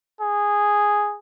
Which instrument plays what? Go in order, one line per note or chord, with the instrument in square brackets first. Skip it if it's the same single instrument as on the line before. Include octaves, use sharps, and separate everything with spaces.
[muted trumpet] G#4